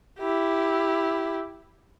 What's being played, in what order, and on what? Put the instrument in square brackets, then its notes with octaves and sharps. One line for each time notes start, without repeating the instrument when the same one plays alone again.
[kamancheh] E4 G4